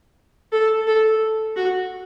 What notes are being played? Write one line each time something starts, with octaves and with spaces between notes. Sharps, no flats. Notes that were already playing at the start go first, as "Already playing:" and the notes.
A4
A4
F#4